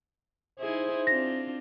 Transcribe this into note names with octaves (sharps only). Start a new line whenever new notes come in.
D#4 E4 G#4 C5
C4 D4 F4 A#6